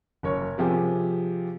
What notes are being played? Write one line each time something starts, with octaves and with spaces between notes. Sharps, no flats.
F#1 A#4 C#5
C3 F3 G4 G#4